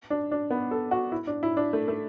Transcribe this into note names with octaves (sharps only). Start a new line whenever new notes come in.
D4
D4
B3
A4
F#4
E4
D4
E4
D4
A3
A3